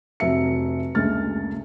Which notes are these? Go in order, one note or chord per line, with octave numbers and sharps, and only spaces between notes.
F1 F#3 E5 C#7
F#1 D2 G#3 F6 A6